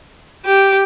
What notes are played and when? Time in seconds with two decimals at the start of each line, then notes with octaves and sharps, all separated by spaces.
0.45 G4